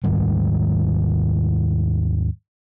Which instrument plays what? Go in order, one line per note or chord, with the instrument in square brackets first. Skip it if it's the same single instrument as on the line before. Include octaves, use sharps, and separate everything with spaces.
[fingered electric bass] D#2 G#2 D#3 G3